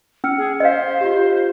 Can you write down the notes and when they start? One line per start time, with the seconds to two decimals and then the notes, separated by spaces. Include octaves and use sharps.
0.24 C#4 E6 F6 C#7
0.38 G#4
0.60 C5 D#5 F5
1.01 F4 G4